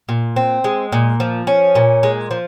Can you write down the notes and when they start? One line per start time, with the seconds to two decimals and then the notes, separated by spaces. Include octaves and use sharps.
0.09 A#2
0.36 C4
0.64 G#3
0.92 A#2
1.20 F3
1.47 C#4
1.75 A#2
2.03 G#3
2.31 F3